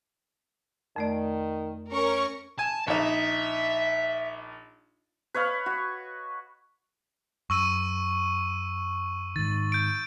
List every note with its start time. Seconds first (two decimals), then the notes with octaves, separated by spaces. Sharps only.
0.96 F2 D#3 A3 D5
1.92 C#4 A#4 C#6
2.59 G#5 A5
2.87 A#1 D#4 E5
5.34 B4 C#5 D#5 F5
5.66 F#4
7.50 F#2 C#6 E6 D#7
9.36 G#2 D#3 A6
9.72 G6 D7